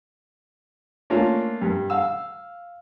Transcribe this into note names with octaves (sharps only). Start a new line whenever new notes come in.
A3 A#3 C#4 D4 F4
G2
F5 E6